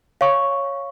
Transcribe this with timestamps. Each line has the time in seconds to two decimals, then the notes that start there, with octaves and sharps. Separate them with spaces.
0.21 C#5 F5 C#6